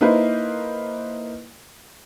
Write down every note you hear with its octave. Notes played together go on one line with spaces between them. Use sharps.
A#3 D#4 E4 B4 C5